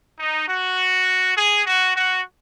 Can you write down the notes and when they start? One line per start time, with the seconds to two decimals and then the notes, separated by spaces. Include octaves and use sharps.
0.18 D#4
0.47 F#4
1.36 G#4
1.65 F#4
1.94 F#4